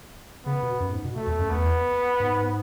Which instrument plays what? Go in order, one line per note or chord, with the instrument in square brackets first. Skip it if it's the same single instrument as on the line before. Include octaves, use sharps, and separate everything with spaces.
[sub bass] C#3 [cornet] B3
[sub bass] B2
F#2
G#2
B2
[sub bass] B2 [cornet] A3
[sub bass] E2
F#2
[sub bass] E2 [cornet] B3
[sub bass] G#2